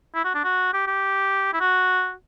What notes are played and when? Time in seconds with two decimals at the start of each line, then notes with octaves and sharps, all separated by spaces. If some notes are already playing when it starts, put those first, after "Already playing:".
0.15 E4
0.24 F#4
0.35 D4
0.44 F#4
0.73 G4
0.87 G4
1.53 E4
1.60 F#4